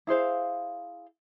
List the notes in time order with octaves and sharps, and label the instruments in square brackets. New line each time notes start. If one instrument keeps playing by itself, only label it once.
[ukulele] E4 G#4 C5 F5